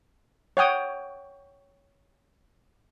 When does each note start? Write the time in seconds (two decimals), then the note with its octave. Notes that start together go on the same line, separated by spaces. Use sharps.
0.57 C#5 F#5 G5 D#6